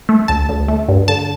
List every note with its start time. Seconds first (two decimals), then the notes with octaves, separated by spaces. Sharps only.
0.09 A3
0.28 D2 A5
0.49 D2
0.68 A3
0.88 G2
1.08 D3 A5